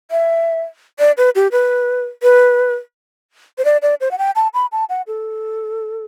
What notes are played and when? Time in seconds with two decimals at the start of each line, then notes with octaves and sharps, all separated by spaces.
0.11 E5
0.99 D5
1.18 B4
1.35 G4
1.52 B4
2.23 B4
3.58 C5
3.65 D5
3.82 D5
4.01 C5
4.11 F#5
4.18 G5
4.36 A5
4.54 B5
4.72 A5
4.89 F#5
5.07 A4